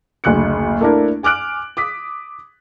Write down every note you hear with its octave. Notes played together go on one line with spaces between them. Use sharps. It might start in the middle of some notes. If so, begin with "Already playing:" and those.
F#1 D2 F#6 C#7
A3 A#3 D4 E4 A#4
G#5 D6 F6 F#6 D7
D6 D#6 B6